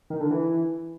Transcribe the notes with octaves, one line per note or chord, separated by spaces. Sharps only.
D#3
D3
E3